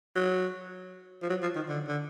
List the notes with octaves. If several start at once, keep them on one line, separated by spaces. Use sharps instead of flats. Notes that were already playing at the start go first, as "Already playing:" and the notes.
F#3
F3
F#3
F3
D#3
D3
D3